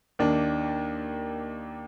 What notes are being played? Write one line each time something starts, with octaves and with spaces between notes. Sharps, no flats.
D#2 D#3 A#3 D4